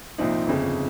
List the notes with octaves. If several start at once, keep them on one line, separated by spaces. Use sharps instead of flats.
C2 A#2 F3 C4 D#4
G1 F2 C#3